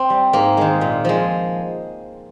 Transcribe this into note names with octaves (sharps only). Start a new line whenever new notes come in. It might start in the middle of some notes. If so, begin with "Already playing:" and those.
Already playing: C4
G3
G#2 A#3
D#3 G#3
A#2
F3 G#3